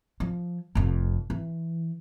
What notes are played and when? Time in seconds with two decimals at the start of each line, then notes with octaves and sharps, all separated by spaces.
0.20 F3
0.75 F1 F2
1.30 E3